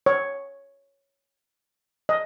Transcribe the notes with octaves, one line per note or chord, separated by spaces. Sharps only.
C#5
D#5